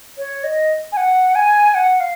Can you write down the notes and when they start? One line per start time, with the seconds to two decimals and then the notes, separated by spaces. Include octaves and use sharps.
0.18 C#5
0.44 D#5
0.92 G#5
0.97 F#5
1.35 G#5
1.75 F#5
2.00 F5